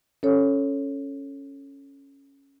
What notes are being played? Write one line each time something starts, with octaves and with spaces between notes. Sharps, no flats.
C#4 A4 C#5